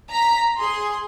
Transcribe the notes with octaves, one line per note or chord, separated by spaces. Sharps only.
A#5 B6
G#4 C6